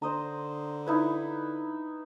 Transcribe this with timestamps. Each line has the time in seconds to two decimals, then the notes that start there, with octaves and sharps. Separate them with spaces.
0.02 D3 C5 D#5 A#5
0.86 D#4 E4 B4